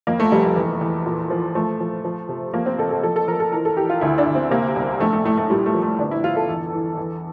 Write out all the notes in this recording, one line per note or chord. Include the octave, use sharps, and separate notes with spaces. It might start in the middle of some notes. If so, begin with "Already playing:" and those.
F2 A#3
A3
F1 G3
A3
E2
E2
A#2
F3
F3 A3
F3
F3
C3
F3 A#3
C4
A1 A4
A4
F3 A4
A4
F3 A#4
A4
E3 A#4
A4
E3 G4
F4
D2 E4
D4
D2
C4
C3 A#3
C2
A#1 A3
A3
A2 A3
A3
A#2 G3
A3
F3
A3
G1 D4
E4
G1 F4
A4
E2
E3
E2